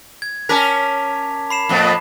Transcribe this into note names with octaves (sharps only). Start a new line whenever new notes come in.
G#6
C#4 A#4 A5 D6 B6
B5 C7 E7
F2 A2 B3